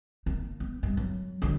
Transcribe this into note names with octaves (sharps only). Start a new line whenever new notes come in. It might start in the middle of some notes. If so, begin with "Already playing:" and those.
A#3 D#4
B3
G2
F#3
D3 F#3